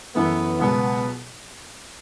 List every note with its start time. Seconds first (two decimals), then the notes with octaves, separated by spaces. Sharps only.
0.15 F#2 E3 A3 B3
0.59 C#2 B2 F#3 B3